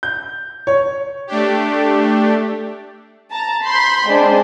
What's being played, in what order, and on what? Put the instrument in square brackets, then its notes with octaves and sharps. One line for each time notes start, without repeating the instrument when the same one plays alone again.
[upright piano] G6
C#5
[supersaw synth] A3 D4 G4
[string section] A5 A#5
B5 C6 G6
G#3 C4 D4